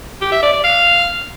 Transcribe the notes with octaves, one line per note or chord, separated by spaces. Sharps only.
G4
E5
D5
D5
F5